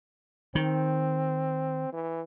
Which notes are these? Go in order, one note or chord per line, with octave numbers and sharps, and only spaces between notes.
D#3 C4
E3